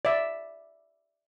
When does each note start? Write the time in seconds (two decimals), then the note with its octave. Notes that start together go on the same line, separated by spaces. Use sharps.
0.05 D5 E5